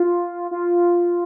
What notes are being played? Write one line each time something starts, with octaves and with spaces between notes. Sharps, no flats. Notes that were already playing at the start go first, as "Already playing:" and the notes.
Already playing: F4
F4